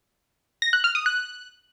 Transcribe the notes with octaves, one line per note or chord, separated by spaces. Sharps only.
A#6
F#6
F6
D#6
F#6